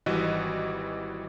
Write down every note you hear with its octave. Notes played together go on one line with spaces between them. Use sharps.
G#1 E3 G3 F#4 B4 D#5